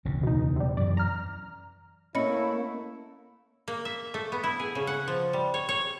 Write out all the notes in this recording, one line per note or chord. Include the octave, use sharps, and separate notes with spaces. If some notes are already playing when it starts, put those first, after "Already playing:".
E1 D2 C#3
B2 D#4
C3 G3
F#2 E3 D5
A#5 F6
A3 A#3 C#4 E4 D#5 B5 C#7
A#3
E5
A3
B3
E4
G#4
C#3
F#5
F3
G3
C#5
C#5